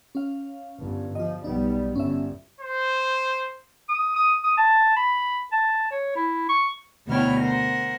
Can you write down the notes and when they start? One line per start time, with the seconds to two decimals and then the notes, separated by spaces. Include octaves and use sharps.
0.15 C#4 F5
0.81 G1 G2
1.15 F3 F4 D#5
1.44 B1 G3 B3 D#4
1.95 G1 G2 C#4 E5
2.61 C5
3.89 D#6
4.16 D#6
4.44 D#6
4.58 A5
4.97 B5
5.52 A5
5.91 C#5
6.16 E4
6.49 C#6
7.07 D2 B2 E4 C#5 G5 F6
7.40 A#4 C5 F#5